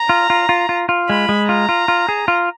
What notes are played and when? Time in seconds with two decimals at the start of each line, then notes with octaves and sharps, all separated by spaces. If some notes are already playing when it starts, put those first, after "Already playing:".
Already playing: A#5
0.09 F4
0.30 F4
0.49 F4
0.69 F4
0.89 F4
1.08 G#3 B5
1.29 G#3
1.49 F4 A#5
1.69 F4
1.88 F4
2.09 G#4
2.28 F4